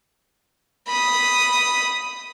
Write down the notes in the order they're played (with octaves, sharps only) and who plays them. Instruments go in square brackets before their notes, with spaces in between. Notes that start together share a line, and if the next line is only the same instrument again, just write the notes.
[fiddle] B5 D#6